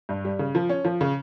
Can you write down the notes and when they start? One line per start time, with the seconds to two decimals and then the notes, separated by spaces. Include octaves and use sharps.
0.09 G2
0.25 G3
0.39 C#3
0.55 F3
0.69 C#4
0.85 F3
1.01 C#3